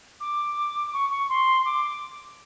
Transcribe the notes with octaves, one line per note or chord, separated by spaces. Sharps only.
D6
C#6
C#6
C6
D6